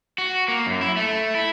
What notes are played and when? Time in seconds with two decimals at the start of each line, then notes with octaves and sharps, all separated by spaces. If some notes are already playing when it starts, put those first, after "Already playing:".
0.18 F#4
0.48 A#3
0.66 F#2
0.81 E4
0.97 A3
1.35 E4